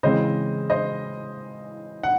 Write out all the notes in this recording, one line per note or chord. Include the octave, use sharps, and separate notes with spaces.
C#3 E3 G#3 C4 C5 D#5
C5 D#5
F#5